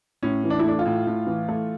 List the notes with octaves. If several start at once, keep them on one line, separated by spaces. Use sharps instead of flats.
A2 C#4
E3
D4
E4
A3 D4
F4
A2
A2
E3
A3